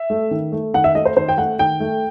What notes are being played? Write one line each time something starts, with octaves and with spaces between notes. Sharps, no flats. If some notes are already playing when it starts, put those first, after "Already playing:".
Already playing: E5
A3
D#3
A3
D#3 F#5
E5
A3 D#5
C5
D#3 C5
G5
A3 F#5
D#3 G5
A3